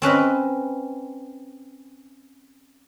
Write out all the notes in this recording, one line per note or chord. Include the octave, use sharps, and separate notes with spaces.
C4 C#4 B4 D#5